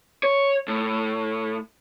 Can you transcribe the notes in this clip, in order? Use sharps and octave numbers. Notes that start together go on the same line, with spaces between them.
C#5
A2